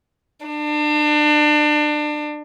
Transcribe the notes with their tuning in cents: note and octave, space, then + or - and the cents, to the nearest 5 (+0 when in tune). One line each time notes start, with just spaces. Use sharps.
D4 +30